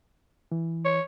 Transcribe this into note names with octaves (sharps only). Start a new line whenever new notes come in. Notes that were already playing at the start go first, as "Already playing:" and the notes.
E3
C#5